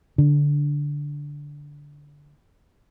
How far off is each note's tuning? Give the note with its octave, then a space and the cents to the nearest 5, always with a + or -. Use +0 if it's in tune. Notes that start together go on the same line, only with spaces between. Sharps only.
D3 -10 D4 +0